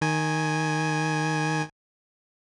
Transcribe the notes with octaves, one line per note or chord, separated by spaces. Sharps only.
D#3 G#5